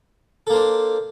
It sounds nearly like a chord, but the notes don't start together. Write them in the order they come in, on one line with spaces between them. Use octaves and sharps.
A4 A#3 C5 D4